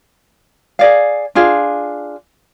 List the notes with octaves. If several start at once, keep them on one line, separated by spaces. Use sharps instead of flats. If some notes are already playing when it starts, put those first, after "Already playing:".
G#4 D5 F5
D4 F4 G#4 F5